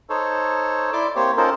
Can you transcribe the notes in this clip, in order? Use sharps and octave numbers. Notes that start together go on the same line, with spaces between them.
D#4 A4 C5 C#5
E4 D5 C6 D6
A#3 C4 G4 C5 C#5
C#4 D#4 F4 A4 A#4 C5